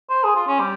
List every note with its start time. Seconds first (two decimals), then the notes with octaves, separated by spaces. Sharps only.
0.09 C5
0.24 G#4
0.36 F4
0.47 C#4
0.59 G3